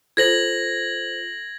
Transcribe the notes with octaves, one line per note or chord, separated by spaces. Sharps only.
F4 A4 C5 G#6 A#6 F#7